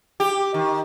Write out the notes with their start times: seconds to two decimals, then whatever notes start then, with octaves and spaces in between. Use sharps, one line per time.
0.20 G4
0.54 D#3